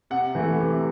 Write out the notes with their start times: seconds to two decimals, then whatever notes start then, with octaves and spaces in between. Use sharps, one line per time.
0.10 C3 F#5
0.35 E3 A3
0.60 C3